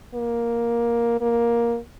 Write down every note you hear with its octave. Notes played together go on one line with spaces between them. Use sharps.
A#3
A#3